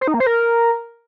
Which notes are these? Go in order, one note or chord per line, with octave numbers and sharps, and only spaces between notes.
C5
D#4
A#3
C5
A#4